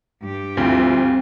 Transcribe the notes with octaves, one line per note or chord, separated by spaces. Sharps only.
G2 G4
D2 F3 C4 E4 F4